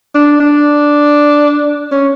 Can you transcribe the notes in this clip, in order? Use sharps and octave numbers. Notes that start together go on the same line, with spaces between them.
D4
D4
C#4